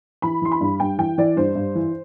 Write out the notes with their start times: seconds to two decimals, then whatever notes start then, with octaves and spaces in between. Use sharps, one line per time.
0.22 E3 B5
0.42 E3 C6
0.52 B5
0.61 G2
0.80 G2 G5
0.98 E3 G5
1.18 E3 D5
1.36 G2 C5
1.55 G2
1.75 E3